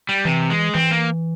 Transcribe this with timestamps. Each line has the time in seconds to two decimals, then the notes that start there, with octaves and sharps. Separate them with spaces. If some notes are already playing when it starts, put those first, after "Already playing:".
0.09 G3
0.25 C3 E3
0.50 G#3
0.74 E3 C4
0.91 A#3